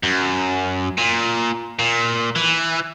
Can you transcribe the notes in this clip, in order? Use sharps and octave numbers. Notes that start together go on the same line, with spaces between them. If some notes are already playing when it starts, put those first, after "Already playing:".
F#2
A#2
A#2
E3